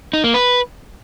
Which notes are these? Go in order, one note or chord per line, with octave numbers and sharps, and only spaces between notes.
D#4
A#3
B4